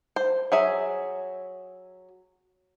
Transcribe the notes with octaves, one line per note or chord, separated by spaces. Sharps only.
C5
F#3 G#4 E5